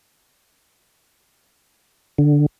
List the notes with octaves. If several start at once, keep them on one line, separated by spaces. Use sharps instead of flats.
D3